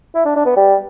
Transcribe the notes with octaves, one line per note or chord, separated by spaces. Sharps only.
E4
D4
D4
B3
G3